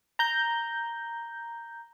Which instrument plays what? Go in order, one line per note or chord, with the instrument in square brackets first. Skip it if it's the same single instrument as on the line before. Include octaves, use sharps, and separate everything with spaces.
[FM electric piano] A#5 G6